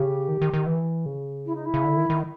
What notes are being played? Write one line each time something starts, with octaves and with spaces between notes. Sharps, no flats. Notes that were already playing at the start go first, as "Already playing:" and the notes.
Already playing: C#3 G4
D#3
D#3
D#3
E3
C#3
E4
D#4
E4
C#3
D3
D#3
D#3